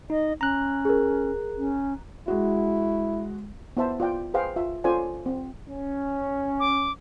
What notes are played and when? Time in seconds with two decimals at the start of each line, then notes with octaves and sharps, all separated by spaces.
0.10 D#4 D#5
0.41 C#4 A#5 F#6
0.85 G#4 A#4
1.58 C#4
2.28 G#3 E4 F#4
3.77 B3 E4 C5 E5 A5
4.00 F4 D5 G5
4.34 G#4 B4 C5 F5 G5
4.56 F4 E5
4.84 C#4 F4 A4 C5 D5 G#5
5.26 C4
5.69 C#4
6.60 D6